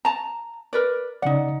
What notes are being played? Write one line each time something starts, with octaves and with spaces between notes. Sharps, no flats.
A5 A#5
A#4 B4 D5
C#3 D#4 D5 F#5